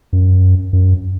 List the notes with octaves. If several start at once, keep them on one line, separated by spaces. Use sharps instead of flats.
F#2
F#2